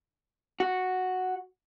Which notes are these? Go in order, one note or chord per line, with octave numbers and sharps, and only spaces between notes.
F#4